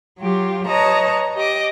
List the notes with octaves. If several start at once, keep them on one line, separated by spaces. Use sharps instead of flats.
F#3 F4 G4
B4 C#5 D#5 A5 A#5
G4 D#5 D6